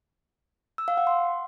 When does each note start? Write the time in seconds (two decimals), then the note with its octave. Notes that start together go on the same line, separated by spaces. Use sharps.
0.78 E6
0.88 F5
0.97 F#5
1.07 C6